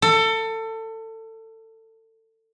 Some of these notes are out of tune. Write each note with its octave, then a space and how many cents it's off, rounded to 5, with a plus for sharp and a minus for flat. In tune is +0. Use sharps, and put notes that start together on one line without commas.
A4 +25